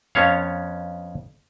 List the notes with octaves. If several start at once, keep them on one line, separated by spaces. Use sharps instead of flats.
F2 B3 C#4 C#5 F5